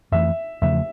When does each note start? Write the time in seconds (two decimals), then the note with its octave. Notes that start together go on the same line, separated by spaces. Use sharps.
0.12 F2 E3 A3 E5
0.62 E2 C#3 F3 A3 E5